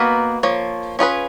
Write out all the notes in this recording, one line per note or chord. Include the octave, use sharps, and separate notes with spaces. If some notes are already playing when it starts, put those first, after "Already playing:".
Already playing: A#3 B3 D#4 F#4 B4
F3 A#3 C#5
C#4 F4 G#4 B4